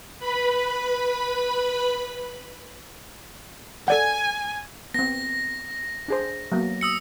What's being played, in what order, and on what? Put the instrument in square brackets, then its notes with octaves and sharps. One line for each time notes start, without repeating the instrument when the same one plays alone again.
[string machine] B4 B5
[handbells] A4 D5 F#5 [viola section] G#5
[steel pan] B3 C4 [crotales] A#6
[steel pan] D4 G#4 C5
F#3 A#3 B3
[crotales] D#6 E6 C#7